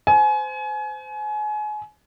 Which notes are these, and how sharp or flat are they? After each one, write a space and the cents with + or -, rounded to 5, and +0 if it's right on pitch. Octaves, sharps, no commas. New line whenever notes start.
C5 -25 G#5 +30